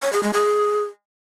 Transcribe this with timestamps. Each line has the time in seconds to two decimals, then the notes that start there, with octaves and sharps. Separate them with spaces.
0.02 C#5
0.13 G#4
0.23 G#3
0.33 G#4